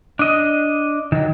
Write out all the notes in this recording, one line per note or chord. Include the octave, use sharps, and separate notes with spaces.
D4 D#5
D#3 F#3